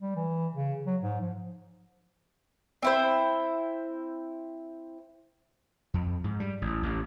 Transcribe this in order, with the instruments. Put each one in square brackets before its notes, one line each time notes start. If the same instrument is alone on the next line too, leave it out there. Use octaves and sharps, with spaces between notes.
[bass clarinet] G3
E3
C#3
F#3
G#2
F3
[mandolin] C4 E4 C5
[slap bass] F2
G#2
G3
A1
A1